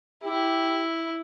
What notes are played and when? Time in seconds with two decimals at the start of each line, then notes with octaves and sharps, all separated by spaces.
0.24 E4 G4